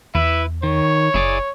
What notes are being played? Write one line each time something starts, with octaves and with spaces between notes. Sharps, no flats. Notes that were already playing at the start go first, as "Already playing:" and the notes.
E2 E4 B4 E5
D#3 C#5
F#1 E4 G#4 D5